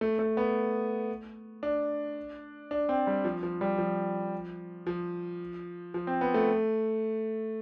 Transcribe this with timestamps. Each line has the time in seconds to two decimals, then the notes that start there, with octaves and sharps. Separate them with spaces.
0.01 A3
0.19 A3
0.37 B3
1.63 D4
2.71 D4
2.89 C4
3.07 G3
3.25 F3
3.43 F3
3.61 G3
3.78 F3
4.87 F3
5.94 F3
6.07 C4
6.21 B3
6.34 A3